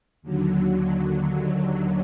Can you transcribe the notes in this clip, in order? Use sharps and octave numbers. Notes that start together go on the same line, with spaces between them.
D#2 D3 F#3